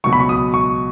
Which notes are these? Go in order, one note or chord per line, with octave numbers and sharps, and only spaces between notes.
C#2 B2 F#3 C#6
B5
C#6
D#6
C#6